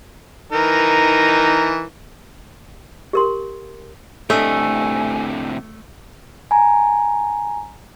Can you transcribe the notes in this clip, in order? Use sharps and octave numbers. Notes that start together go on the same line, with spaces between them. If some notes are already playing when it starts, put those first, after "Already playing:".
E3 D#4 A#4
G4 A#4 C6
A2 C3 A3 D4 D#5 G#5
G#5 A#5